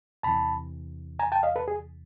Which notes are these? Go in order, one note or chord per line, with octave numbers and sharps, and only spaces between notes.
E2 C3 E3 A5 B5
G#5 A#5
G5 A5
D#5 F5
A4 B4
G#4